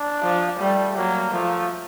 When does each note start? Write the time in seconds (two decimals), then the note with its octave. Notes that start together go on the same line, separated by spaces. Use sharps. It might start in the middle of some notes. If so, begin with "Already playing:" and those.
Already playing: D4
0.23 F3
0.59 G3 A3
0.97 F#3 A#3
1.33 F3 A3